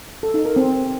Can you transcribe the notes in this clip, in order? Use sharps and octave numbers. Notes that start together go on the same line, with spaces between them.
A4
D#4
A#4
C4